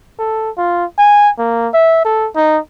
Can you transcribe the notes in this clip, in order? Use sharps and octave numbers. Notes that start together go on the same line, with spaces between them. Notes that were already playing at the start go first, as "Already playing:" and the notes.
A4
F4
G#5
A#3
E5
A4
D#4